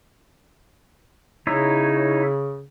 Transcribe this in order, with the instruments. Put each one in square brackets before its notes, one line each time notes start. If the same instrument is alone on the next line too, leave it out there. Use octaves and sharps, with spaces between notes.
[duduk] C#3 [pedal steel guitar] D#4 E4 C#5